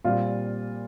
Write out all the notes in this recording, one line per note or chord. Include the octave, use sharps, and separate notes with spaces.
A#2 G3 C4 F4